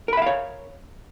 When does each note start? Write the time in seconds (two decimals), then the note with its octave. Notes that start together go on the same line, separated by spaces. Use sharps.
0.08 A#4
0.13 B5
0.17 E5
0.22 F5
0.26 C#5